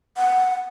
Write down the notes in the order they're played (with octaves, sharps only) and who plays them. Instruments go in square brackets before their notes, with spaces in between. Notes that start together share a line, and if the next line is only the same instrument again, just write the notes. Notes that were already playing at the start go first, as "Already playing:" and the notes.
[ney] F#5